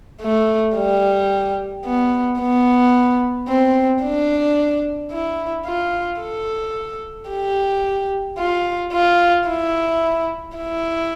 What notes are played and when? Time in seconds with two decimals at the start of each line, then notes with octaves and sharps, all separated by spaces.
0.21 A3
0.76 G3
1.85 B3
2.40 B3
3.48 C4
4.03 D4
5.12 E4
5.66 F4
6.21 A4
7.30 G4
8.38 F4
8.93 F4
9.48 E4
10.57 E4